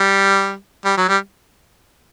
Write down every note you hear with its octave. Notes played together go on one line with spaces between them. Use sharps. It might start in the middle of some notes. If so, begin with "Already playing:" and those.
Already playing: G3
G3
F#3
G3